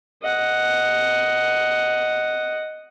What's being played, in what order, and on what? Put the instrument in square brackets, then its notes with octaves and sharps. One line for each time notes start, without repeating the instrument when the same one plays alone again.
[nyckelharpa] D#5 F#5